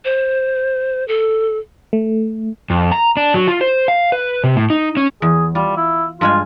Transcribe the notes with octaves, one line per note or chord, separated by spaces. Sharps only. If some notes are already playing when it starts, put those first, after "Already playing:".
C5
A4
A3
F2
A#5
D4
F#3
F4
C5
F5
B4
C3
A2
D#4
C#4
E2 G#4
G3 F4
E4
G2 G#3 F4 G#5